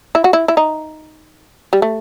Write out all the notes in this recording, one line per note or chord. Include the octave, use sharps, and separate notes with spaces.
E4
F#4
E4
E4
D#4
G3
A3